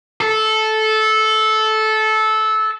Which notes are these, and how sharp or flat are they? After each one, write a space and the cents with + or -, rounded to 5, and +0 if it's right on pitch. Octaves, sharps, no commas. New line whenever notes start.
A4 -15